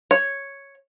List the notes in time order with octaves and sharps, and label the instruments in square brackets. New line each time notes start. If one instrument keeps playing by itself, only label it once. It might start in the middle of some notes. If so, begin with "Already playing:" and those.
[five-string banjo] C#5